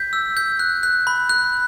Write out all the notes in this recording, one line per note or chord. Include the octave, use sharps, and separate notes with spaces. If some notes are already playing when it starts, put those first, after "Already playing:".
Already playing: G6 B6
E6
G6
F#6
F#6
B5
F#6